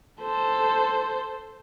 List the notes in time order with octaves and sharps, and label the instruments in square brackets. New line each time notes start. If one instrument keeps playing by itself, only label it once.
[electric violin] A4 C5